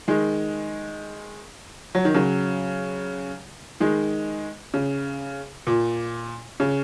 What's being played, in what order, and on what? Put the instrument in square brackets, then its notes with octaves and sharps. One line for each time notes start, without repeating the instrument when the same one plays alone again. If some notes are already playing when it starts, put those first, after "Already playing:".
[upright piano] D#3 G#3
F#3
D#3
C#3 F#3
D#3 G#3
C#3
A#2
C#3